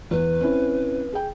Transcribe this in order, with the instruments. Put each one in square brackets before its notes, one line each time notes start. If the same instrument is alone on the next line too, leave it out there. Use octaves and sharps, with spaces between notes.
[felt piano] E2 [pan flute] B4
[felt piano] C4 C#4 E4
G#4 G5